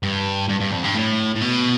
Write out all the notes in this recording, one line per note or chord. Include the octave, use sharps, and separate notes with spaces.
G2
G2
G2
F2
G2
A2
A2
B2